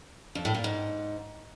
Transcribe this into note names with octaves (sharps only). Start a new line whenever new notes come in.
F2
A2
A#2
G#2